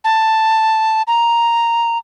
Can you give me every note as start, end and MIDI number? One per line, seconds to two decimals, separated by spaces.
0.04 1.02 81
1.07 1.98 82